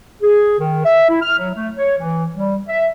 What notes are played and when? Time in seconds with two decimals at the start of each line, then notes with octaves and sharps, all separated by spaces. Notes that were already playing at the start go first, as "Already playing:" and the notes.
0.22 G#4
0.59 D#3
0.85 E5
1.09 E4
1.22 F6
1.38 F#3
1.55 A3
1.76 C#5
1.98 E3
2.35 G3
2.68 E5